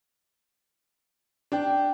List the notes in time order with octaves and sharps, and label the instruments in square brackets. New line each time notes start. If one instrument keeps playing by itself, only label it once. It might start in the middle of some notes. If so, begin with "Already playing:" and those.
[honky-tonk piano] D4 [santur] D5 G5